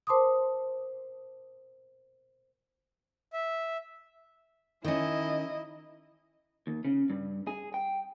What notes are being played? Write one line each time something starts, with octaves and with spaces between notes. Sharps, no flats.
A#4 C5 A5 C6 D6 D#6
E5
D#3 C#4 E4 D#5
D#2
C#3
G2
G#4
G5